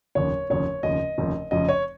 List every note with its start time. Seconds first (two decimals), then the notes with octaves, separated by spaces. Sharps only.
0.15 F1 D#2 C#3 F3 C#5
0.50 F1 D#2 C#3 F3 C#5
0.83 F1 D#2 C#3 F3 D#5
1.18 F1 D#2 C#3 F3
1.51 F1 F2 C#3 F3 D#5
1.69 C#5